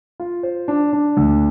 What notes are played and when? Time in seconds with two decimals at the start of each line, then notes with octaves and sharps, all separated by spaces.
0.20 F4
0.43 C5
0.68 D4
0.93 D4
1.17 D2